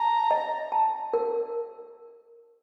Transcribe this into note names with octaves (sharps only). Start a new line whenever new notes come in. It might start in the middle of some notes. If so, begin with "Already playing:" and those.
Already playing: A5 A#5
D#5
A5
A#4